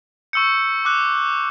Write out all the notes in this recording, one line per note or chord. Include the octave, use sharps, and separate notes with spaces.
C#6 E6 G6 C#7
D6 F#6